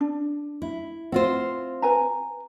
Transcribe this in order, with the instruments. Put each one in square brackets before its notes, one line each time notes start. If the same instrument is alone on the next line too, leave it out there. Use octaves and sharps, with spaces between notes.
[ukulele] D4
[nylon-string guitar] E4
[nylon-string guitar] C4 F4 C5 [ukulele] F#5
[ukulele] B4 G#5 A#5